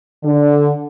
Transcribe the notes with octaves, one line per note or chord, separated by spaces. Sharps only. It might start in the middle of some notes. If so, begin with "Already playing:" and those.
D3